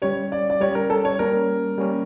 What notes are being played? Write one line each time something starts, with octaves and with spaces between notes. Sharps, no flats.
G3 C#4 G4 C#5
D5
D5
G3 C#4 G4 C#5
A#4
A4
C#5
G3 A#3 C#4 A#4
G3 A#3 C#4